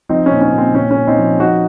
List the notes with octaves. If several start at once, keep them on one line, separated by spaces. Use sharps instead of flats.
F3 C4 D#4
A#2 C#4
C#4
A#2
C4
A#2 C#4
C#4
A#2
C4 D#4
F3
F3 D#4 F#4